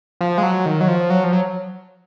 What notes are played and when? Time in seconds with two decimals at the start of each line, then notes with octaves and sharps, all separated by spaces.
0.21 F3
0.38 G#3
0.43 F#3
0.66 D#3
0.81 F#3
0.88 F3
1.10 F#3
1.24 F3
1.33 F#3